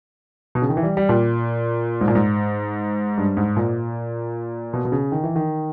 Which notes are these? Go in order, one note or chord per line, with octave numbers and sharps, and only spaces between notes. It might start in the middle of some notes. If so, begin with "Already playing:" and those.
B2
C#3
D#3
E3
G3
G3
A#2
G#2
A#2
G#2
G2
G#2
A#2
B2
B2
C#3
D#3
E3
D#3